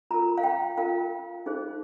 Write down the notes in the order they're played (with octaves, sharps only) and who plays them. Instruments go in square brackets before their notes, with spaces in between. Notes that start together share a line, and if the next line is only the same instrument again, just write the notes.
[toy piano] F4 A#4 A#5
F5
G5
F4 A#4 F5
D#4 G#4 C5